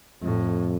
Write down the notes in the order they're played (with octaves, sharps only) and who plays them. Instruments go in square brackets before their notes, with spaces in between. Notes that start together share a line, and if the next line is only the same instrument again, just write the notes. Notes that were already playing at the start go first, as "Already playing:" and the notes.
[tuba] F2 [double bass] A2